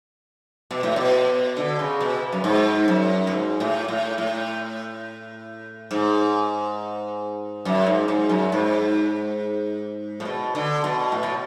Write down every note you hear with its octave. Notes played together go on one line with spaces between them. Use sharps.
B2
A2
B2
D3
C#3
B2
F#2
G#2
F#2
A2
G#2
A2
A2
A2
G#2
F#2
G#2
G#2
F#2
G#2
A2
B2
D3
B2
A2
B2